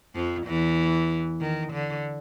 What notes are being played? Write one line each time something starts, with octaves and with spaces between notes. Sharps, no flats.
F2 F3
E2 E3
D#3
D3